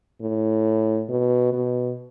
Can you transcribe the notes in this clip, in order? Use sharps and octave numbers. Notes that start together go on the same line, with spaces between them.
A2
B2
B2